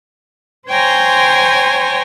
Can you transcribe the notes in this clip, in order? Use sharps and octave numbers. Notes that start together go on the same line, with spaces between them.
C5 C#5 G5 G#5 A#5 C6